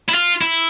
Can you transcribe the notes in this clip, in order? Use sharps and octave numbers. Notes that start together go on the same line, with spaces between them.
E4
F4
E4